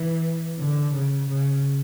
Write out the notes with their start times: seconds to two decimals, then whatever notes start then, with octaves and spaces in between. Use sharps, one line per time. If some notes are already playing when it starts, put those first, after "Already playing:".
Already playing: E3
0.60 D3
0.95 C#3
1.30 C#3